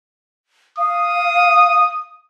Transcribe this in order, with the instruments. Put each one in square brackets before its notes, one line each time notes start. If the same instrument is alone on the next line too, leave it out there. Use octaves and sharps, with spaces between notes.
[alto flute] F5 [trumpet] D#6